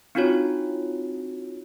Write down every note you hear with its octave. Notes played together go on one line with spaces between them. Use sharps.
C4 D4 D#4 F4 F#4 C#5